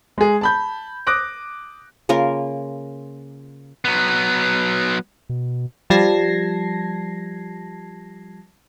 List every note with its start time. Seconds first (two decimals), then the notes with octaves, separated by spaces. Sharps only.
0.18 G#3 G#4
0.41 A5 B5 G6
1.07 D6 D#6 F#6 A#6 D7
2.09 C#3 A#3 F4 A#4
3.85 F#3 B3
5.29 B2
5.90 F3 G3 A5 G#6 A#6 C7